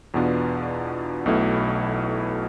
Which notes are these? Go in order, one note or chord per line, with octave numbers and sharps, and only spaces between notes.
E2 B2 B3 D4 F4
B1 B2 A3 E4